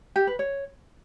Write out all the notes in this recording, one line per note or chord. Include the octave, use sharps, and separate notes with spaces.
G4
B4
C#5